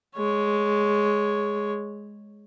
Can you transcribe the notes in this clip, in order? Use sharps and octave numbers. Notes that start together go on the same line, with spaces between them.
G#3 C#5